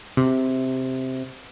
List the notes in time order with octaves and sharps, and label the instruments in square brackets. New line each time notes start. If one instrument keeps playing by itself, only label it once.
[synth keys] C3